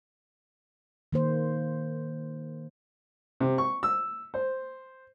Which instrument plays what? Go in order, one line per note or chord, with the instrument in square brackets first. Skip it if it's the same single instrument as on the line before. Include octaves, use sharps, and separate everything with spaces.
[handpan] D#3 A#3 C5
[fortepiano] C3
C#6
E6
C5